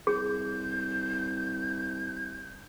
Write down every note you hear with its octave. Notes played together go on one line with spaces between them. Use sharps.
C2 G#4 G6